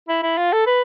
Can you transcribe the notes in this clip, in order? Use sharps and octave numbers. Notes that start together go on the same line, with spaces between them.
E4
E4
F4
A4
B4